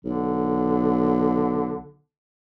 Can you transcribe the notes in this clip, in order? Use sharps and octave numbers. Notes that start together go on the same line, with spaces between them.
B1 D3